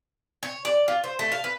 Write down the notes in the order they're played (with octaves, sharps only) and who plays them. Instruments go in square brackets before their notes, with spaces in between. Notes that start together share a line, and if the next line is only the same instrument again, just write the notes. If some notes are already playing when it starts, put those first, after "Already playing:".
[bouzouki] C#5
D5
F4
C5
A3
F5
B4